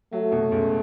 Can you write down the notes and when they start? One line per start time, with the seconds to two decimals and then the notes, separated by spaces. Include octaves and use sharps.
0.13 F#3 A3
0.32 B2
0.52 C#2